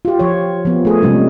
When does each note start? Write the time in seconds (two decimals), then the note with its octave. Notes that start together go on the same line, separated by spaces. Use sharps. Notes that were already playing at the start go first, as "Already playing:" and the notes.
0.05 F4 G4
0.19 F3 C#5
0.65 F3 B3
0.85 A3 G#4
1.02 C3 G3 G#3 C#4